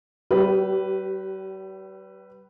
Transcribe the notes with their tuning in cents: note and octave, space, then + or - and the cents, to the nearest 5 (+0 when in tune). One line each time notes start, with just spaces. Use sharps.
G3 -45 G4 -20 B4 +0